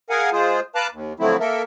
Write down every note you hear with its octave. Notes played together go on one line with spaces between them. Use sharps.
G#4 A#4 F5 F#5 G#5
G#3 F4 G#4 C5
B4 F5 A5 A#5 D6 F#6
D#2
D3 F3 F#3 A3 C4 E4
A#3 A4 A#4 E5